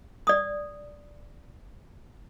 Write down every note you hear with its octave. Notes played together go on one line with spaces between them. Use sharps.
D5 D#6